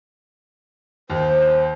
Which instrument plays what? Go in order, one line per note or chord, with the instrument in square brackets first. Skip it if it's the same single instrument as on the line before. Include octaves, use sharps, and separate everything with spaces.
[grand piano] D#2 [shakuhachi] C5